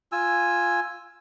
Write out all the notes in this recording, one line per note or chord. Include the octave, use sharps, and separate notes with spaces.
F4 G#5 E6